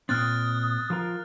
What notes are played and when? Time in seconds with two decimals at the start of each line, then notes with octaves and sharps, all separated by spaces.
0.09 A#2 C4 D#6 F6 F#6 A6
0.90 F3 F4 A#4